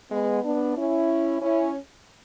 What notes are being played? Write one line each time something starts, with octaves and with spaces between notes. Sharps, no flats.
G#3 B3
B3 D4
C#4 E4
C#4 E4